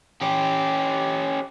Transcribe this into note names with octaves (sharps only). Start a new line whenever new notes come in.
C#4 G4